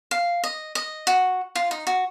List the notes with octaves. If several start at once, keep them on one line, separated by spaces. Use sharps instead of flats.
F5
D#5
D#5
F#4
F4
D#4
F#4